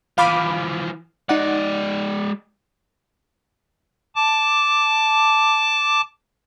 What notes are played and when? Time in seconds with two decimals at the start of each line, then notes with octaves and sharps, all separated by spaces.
0.18 E3 F3 F5 B5 D6
1.29 G#3 D#4 D5 F#5
4.16 A5 D6